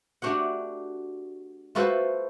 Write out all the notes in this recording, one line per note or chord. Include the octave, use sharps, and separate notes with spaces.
A3 D4 F#4 G4 F#5
A3 F4 F#4 A4 B4 C5